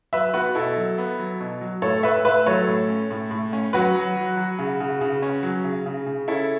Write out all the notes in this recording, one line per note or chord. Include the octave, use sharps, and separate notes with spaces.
F#3 B4 E5
B3 F#4 B4
B2 E4 A4
F#3
B3
F#3
B2
F#3
A2 A4 C#5
A2 B4 E5
A2 B4 E5
F#3 A4 C#5
A2
C#4
A2
A2
C#4
F#3 F#4 B4
F#3
F#3
F#3
C#3
C#3
C#3
C#4
F#3
C#3
C#3
C#3
C#4 E4 A4